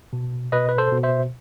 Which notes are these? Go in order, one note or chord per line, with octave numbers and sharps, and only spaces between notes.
B2
B2 B4 D#5
B4
A4 C5
B2
C5 E5